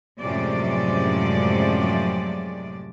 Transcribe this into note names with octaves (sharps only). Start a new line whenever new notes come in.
F#2 A2 C3 F3 G#3 D5